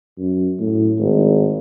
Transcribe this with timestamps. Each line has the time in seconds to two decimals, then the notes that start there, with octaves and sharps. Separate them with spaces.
0.18 F#2
0.60 A2
0.99 G#1